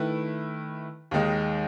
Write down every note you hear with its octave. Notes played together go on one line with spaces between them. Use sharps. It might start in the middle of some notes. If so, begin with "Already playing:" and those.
Already playing: D#3 A3 E4 B4
D#2 D#3 G#3 D#4